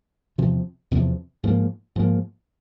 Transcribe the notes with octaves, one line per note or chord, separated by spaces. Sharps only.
E2 C3 F3
E2 C3 F3
G#2 F3 A#3
G#2 F3 A#3